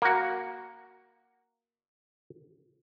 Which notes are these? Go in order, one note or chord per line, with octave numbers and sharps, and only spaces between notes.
A#3 F#4